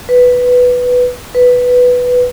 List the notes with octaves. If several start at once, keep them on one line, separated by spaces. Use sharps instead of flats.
B4
B4